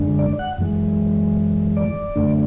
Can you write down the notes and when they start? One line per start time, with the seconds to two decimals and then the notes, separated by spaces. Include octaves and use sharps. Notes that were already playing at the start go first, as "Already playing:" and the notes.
Already playing: F#2 D3 G#3 D4
0.19 D5
0.39 F#5
0.58 F#2 E3 G#3
1.77 D5
2.16 F#2 D3 A3 D4